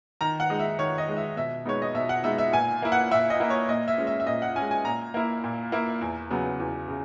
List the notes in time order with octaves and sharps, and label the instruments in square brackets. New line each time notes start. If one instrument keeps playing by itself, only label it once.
[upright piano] D#3 A#5
F#5
G#3 D#4
E5
D#3 C#5
D#5
G#3 D#4
E5
B2 E5
G#3 B3 D#4 C#5
D#5
B2 E5
F#5
G#3 B3 D#4 E5
E5
A#2 G#5
A#3 E4
F#5
A#2 E5
D#5
A#3 E4
C#5
A#2 D#5
E5
G#3 C#4
E5
E5
A#2 D#5
F#5
G#3 C#4 G#5
G#5
A#2 A#5
A#3 E4
A#2
A#3 E4
E2
C#3 F#3 B3
E2
C#3